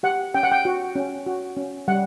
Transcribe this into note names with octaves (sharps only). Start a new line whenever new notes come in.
G4 F#5
C#4 G5
F#5
G5
F#4
C#4
F#4
C#4
G3 F#5